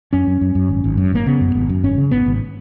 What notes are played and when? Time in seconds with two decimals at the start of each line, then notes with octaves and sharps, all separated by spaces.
0.13 F#2 C#4
0.27 F#2
0.41 F#2
0.55 F#2
0.69 G#1
0.84 G#1
0.97 F#2
1.12 G#1 A#3
1.26 C#3 B3
1.41 F#2
1.55 G#1
1.69 F#2
1.84 G#1 C#4
1.98 C#3
2.11 G#1 B3
2.26 G#1